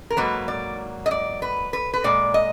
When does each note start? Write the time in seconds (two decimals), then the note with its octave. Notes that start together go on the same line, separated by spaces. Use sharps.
0.10 A#4
0.17 G#2 F#3 A#3 B4
0.48 D5
1.06 D#5
1.11 D5
1.42 B4
1.73 B4
1.94 B4
2.04 A#2 G#3 D5
2.34 D#5